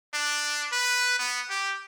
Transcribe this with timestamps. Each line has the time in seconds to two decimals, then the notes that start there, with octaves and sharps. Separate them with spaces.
0.13 D4
0.72 B4
1.19 B3
1.50 G4